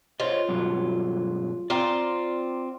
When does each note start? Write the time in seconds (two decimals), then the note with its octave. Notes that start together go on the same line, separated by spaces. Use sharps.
0.20 F4 C5 C#5 D#5
0.49 G2 B2 F#3
1.70 C4 F4 D5 A#5